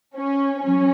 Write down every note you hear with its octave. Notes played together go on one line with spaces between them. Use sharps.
C#4
F#3 C#4